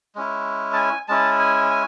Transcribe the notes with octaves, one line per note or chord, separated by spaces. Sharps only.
G#3 C#4 E4
A5
G#5
G#3 C#4 E4 A5
G#5
G#5